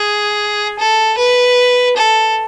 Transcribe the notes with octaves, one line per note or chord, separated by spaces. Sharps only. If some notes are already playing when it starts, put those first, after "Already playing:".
Already playing: G#4
A4
B4
A4